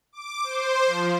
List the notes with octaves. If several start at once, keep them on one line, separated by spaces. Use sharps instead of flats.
D6
C5
F3